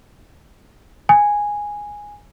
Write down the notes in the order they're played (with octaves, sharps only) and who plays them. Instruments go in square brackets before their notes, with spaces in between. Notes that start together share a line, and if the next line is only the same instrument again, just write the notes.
[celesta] G#5